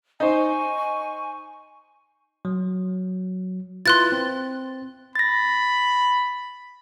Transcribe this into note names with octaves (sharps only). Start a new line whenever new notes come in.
D#4 C5 G#5 C#6
F#3
E4 F4 B4 C6 F#6 A6
C4
B5 A6 A#6